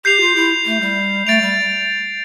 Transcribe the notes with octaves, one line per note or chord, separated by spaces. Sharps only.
G4 G6 C7 F7
F4
E4
A3
G3
A3 A6 D7 F7
G3